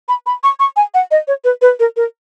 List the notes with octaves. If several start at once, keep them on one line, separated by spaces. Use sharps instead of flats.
B5
B5
C#6
C#6
G#5
F#5
D#5
C#5
B4
B4
A#4
A#4